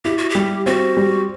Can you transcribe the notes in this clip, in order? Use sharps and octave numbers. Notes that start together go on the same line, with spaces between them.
E4 G4
F#4
G4
G3
C4 F#4
G3